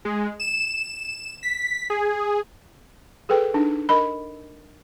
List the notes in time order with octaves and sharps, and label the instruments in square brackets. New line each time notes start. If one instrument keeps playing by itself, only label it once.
[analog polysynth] G#3
E7
B6
G#4
[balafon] G#4 A4 B4 G5
D4 D#4
A#4 D#5 B5